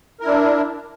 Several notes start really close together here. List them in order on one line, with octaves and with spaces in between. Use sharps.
A#4 E4 D4